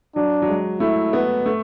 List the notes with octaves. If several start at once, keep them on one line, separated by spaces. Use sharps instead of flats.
F#3 D4
F#3
G#3
A3 E4
B3
A3